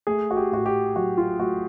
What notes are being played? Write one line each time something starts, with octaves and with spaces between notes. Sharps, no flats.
A3 G#4
F#4
G4
A2 F#4
G4
F#3 F#4
F4
A3 F#4